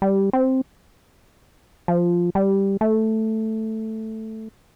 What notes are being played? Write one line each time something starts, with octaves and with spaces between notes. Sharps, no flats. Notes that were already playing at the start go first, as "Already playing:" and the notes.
G3
C4
F3
G3
A3